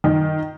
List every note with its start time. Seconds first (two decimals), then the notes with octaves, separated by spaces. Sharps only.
0.04 D#3